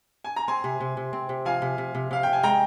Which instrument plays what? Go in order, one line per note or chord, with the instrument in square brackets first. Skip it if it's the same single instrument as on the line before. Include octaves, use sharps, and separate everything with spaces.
[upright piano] G#5
A#5
[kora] C4 [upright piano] G#5 C6
[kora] C3
C3
C3
C4
C3
[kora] F3 [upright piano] F5 G#5
[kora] C3
C3
C3
[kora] C3 [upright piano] F5
[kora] C3 [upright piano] G5
[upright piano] G#5
[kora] G#3 [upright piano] G5 A#5